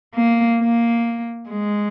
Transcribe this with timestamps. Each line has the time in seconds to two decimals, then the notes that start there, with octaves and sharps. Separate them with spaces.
0.15 A#3
0.60 A#3
1.49 G#3